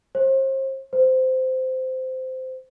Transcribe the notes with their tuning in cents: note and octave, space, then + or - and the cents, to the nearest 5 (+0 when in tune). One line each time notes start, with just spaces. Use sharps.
C5 +35
C5 -15